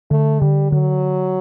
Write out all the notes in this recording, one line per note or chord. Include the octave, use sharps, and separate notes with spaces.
D3 A3
D3 G3
D3 F#3